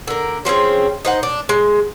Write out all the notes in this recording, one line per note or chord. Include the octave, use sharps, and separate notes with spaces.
D3 A#4
F3 C4 C#4 G#4
D#4 C5 F#5
D4
G#3